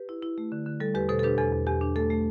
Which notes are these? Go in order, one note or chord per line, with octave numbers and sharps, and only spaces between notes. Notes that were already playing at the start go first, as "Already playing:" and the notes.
Already playing: G4 B4
E4
E4
A3
D3
D3
G3 A4
E2 G4 B4
B2 A4 C5
A4
D4 G4 B4
E2 A4
E2
E2 G4
D4
A3 A4
A3